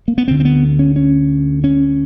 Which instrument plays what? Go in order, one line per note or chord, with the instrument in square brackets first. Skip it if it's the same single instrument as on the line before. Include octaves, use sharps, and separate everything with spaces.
[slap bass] A#3
B3
D2 D3 C4
C4
B3
C#4
C#4
C#4